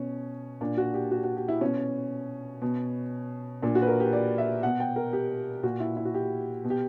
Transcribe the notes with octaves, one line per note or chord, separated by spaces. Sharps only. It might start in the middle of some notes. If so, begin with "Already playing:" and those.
Already playing: B2 C#4
A#2 D4
F#4
G4
F#4
F#4
G4
E4
B2 C#4
B2
A#2 D4
F#4
B4
A#4
G4
D5
E5
B2 F#5
G5
A#4
G4
A#2 F#4
E4
E4
F#4
G4
B2
G4